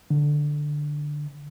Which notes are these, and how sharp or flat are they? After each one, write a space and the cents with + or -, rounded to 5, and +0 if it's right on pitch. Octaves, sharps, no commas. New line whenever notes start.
D3 +5